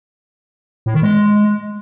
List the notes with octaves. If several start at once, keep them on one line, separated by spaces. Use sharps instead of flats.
A2
D#3
G#3